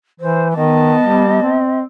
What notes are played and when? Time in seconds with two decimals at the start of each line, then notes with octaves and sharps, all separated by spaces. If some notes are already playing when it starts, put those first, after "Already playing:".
0.20 E3 C5
0.56 D#3 B3 D#5 A5
1.01 G3
1.42 C4